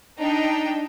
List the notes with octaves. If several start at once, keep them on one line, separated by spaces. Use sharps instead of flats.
D4 D#4 G5